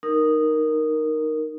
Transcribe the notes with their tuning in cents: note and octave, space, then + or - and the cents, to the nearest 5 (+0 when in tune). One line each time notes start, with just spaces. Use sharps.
D#4 -10 A#4 +0